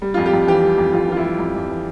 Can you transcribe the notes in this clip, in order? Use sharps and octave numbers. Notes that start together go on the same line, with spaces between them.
G3
F4
F2
G4
F2
E3 G4
G3
F2
F2 F4
E3 F4
E4
G3
F2
F2
E3